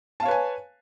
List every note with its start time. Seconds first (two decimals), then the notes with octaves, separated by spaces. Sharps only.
0.20 A5
0.23 F5
0.25 C#5
0.28 B4
0.31 G#5